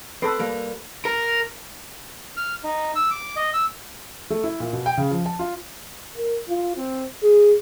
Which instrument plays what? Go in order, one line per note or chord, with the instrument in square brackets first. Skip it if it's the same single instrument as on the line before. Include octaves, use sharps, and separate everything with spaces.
[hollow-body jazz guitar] C4 [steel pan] A4 B4
[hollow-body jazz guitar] G3 A#3
[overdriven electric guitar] A#4
[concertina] F6
D#4
E6
D6
D#5
E6
[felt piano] A3
E4
A#2
B2
G5
C#3
F3
A5
F4
[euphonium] A#4
F4
C4
G#4